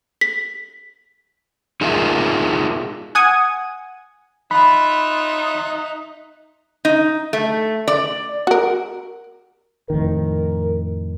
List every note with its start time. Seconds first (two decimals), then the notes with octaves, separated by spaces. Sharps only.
0.21 B6
1.81 D#4 F4 G#4 A#4 E5 F5
3.15 F#5 G#5 D#6 G#6
4.51 D#4 F4 E5 B5 F#6
6.85 D#4
7.33 A3
7.88 D5
8.47 F#4 A#4
9.90 F2 A2 D#3 A#4